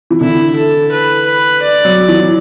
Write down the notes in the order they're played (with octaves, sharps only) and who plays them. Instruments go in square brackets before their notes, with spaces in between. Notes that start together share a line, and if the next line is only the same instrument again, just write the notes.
[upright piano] E3
[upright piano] D3 [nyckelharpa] E4
[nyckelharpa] A4
B4
B4
D5
[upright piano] F#3
E3